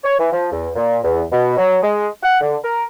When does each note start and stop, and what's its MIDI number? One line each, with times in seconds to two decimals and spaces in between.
0.04 0.18 73
0.19 0.29 52
0.32 0.49 53
0.52 0.69 40
0.76 0.98 46
1.04 1.23 40
1.32 1.56 47
1.58 1.77 54
1.83 2.08 56
2.23 2.38 78
2.41 2.56 50
2.64 2.85 70